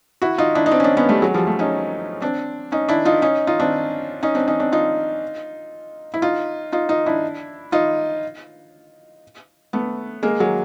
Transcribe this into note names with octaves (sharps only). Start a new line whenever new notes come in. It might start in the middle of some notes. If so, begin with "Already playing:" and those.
E4 F#4
D#4 F4
D4 E4
D#4
C4 D4
C#4
C4 D4
B3 C#4
G3 A3
F#3 G#3
F3 G3
G3 A3
C#4 D#4
C4 D4
C#4 D#4
D4 E4
D#4 F4
C#4 D#4
D#4 F4
C4 D4
C#4 D#4
C4 D4
C#4 D#4
C4 D4
D#4 F4
E4
D#4 F4
D#4 F4
D#4 F4
D4 E4
D#4 F4
A3 B3
G#3 A#3
F#3 G#3